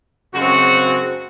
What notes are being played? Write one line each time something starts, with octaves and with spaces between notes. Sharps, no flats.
F#2 C#3 G#3 C4 F#4